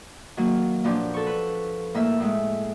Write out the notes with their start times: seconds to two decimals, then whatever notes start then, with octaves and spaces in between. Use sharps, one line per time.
0.37 D#3 F#3 A#3
0.84 A#2 F3 B3 D4 G4
1.14 A4 C#6
1.26 B4
1.94 A2 A#3 A#4 E5
2.20 A2 G#3